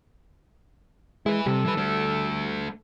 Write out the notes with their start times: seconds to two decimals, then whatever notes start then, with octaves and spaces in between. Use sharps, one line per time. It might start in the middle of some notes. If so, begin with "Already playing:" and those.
1.26 G#3 E4 B4
1.46 C3 G3 A4
1.65 E3 B4
1.77 A3 D4